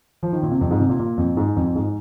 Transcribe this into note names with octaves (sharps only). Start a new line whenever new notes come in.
F3
D#3
A#2
C3
F2
G#2
C3
A#2
A#2
F2
G#2
F2
G#2